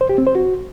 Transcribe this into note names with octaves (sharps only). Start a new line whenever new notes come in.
C5
G4
C4
C5
F#4